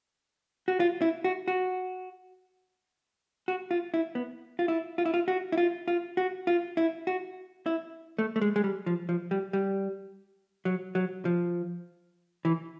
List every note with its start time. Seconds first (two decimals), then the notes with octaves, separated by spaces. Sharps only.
0.68 F#4
0.80 F4
1.02 E4
1.24 F#4
1.48 F#4
3.48 F#4
3.71 F4
3.94 E4
4.15 B3
4.59 F4
4.68 E4
4.98 F4
5.05 E4
5.14 F4
5.28 F#4
5.52 E4
5.58 F4
5.88 F4
6.17 F#4
6.47 F4
6.77 E4
7.07 F#4
7.66 E4
8.18 A3
8.36 A3
8.41 G#3
8.56 G#3
8.64 G3
8.86 F3
9.09 F3
9.31 G3
9.53 G3
10.65 F#3
10.95 F#3
11.25 F3
12.45 E3